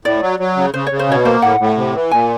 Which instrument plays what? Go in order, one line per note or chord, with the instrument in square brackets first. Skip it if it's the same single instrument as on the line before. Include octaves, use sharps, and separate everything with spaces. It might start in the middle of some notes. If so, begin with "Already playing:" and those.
[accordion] A2 [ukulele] D5
[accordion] F#3
F#3
C#3
[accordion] C#3 [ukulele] C5
[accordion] C#3 [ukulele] C#5
[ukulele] C5
[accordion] B2 [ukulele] C#5
[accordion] A#3 [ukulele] C5
[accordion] A2 [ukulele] F#5
[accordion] A2
C3
E3
[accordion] A#2 [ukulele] G#5